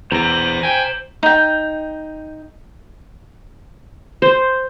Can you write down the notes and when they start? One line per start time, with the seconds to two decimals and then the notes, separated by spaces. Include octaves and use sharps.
0.11 E2 C5 A#5 A#6
0.63 G5 G#5
1.23 D#4 G5
4.22 C5